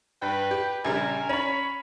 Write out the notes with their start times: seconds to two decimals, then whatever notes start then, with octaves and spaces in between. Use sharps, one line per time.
0.22 G2 B4 G5
0.51 G4
0.85 A#1 C#3 G3 A#4 G#5
1.29 C#4 C#5 B5